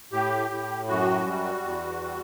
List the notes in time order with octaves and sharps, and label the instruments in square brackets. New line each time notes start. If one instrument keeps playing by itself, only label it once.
[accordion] A2 G4
A2
F#2 F#4
G3
E2
G3